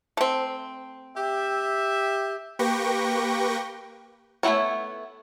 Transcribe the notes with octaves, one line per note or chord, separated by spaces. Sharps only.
A3 C4
G4 E5
A#3 G4 B4 G5 C#6 A#6
A3 B3 C4 E4 C#5